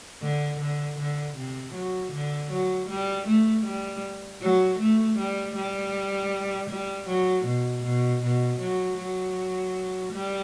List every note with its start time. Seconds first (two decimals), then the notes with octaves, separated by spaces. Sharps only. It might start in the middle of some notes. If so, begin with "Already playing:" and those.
0.22 D3
0.60 D3
0.98 D3
1.37 C3
1.74 F#3
2.12 D3
2.51 F#3
2.90 G3
3.27 A3
3.66 G3
4.42 F#3
4.79 A3
5.18 G3
5.56 G3
6.70 G3
7.08 F#3
7.46 B2
7.84 B2
8.23 B2
8.60 F#3
8.99 F#3
10.12 G3